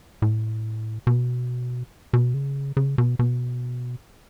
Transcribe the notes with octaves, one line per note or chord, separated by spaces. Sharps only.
A2
B2
B2
C#3
C#3
B2
B2